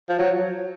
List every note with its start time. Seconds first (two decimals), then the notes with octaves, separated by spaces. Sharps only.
0.09 F3
0.19 F#3